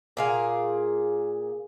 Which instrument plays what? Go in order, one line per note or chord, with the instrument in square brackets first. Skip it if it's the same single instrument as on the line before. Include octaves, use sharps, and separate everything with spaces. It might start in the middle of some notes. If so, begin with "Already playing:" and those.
[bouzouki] A#2 G#4 F5